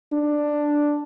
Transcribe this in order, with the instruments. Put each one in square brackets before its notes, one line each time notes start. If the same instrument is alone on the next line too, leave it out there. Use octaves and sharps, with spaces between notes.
[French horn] D4